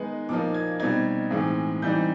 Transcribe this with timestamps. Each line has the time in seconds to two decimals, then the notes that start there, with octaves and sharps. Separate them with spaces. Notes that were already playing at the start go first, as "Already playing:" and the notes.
Already playing: D#3 G#3 B3 D#4
0.29 A#2 F3 A#3 D#4 D6
0.54 G#6
0.79 B2 G3 C4 D#4 G#6
1.31 A2 E3 G#3 C4 D#4
1.82 E3 G3 C4 D#4 G6